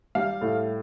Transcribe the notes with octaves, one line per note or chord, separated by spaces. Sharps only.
G3 F5
A2